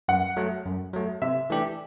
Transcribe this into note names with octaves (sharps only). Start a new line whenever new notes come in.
F#2 F#5
F#3 A3
F#2
F#3 A3
C3 E5
E3 A3 D4 G4